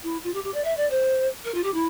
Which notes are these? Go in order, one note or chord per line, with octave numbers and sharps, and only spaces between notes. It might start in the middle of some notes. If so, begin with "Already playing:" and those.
E4
F4
G4
G4
D5
E5
D5
C5
A#4
F4
G4
E4